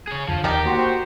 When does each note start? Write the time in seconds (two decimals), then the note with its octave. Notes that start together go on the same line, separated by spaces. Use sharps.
0.08 G#4 C#5
0.28 F2 D3 F3
0.44 D#2 D#3 D#4 G4
0.65 A#3 F#4 C5